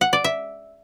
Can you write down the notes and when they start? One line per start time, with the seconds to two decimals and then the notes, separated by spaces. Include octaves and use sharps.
0.01 F#5
0.13 D5
0.24 E5